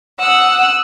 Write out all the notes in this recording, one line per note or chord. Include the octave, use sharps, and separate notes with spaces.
F#5 D#6 E6 F#6